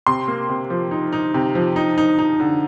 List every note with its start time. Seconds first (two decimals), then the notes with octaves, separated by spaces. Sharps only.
0.07 C3 C6
0.28 A#3
0.49 C3
0.70 F3
0.91 D#4
1.13 D#4
1.34 C3
1.55 F3
1.76 D#4
1.98 D#4
2.19 D#4
2.40 D3